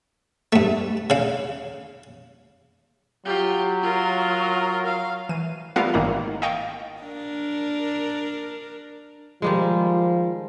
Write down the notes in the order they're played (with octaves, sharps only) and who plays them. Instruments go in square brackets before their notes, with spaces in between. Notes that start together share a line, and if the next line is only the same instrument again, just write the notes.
[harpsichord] G2 A3
C#3 F5
[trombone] F#3 [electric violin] F4 G4
[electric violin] F4 A#4
F5
[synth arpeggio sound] E3 D#7
G3 A3 B3 F4 A#4 F5
G#1 G#2 D#3 E3 A#3 A#5
D#5 F5 G5 C#6 A6
[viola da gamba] D4 A#4
[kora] D#3 G3 G#3 [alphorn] F3